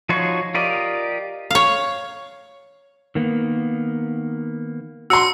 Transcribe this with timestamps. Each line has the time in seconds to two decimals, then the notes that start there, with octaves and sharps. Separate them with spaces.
0.09 F3 D#4 F#4 C#5 C6
0.54 F4 G4 A#4 D5 D#5
1.50 C#5 F5
3.15 D#3 A#3 B3
5.10 F#4 C6 E6 C#7